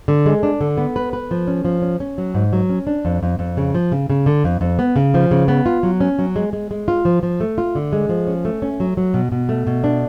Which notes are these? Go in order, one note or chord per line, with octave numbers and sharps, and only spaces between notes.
D3
G#3
D4
D3
B3
B4
B4
F3
C#4
F3
C#4
C#4
F#3
G#2
F#3
C#4
D4
F2
F2
F2
C#3
F3
C#3
C#3
D3
F2
F2
B3
C#3
F3
C#3
B3
F4
F#3
C#4
F#3
G#3
G#3
G#3
F4
F3
F3
A3
F4
D3
G#3
F3
C#4
A3
C#4
F#3
F#3
B2
B2
A3
B2
D4